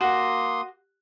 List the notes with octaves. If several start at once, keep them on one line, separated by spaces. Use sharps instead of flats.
A#3 F#4 C6 D#6